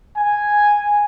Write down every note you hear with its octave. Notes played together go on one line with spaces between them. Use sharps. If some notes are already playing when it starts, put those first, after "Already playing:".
G#5